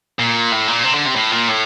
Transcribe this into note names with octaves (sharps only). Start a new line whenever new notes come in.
A#2
A2
A#2
C3
D3
C3
A2
A#2
A2